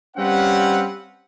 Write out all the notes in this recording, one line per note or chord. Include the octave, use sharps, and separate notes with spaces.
G3 C4 C#4 B4 F5 F#5